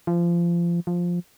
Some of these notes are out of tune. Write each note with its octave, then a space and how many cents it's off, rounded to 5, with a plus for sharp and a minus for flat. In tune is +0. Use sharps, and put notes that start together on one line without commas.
F3 -25
F3 +5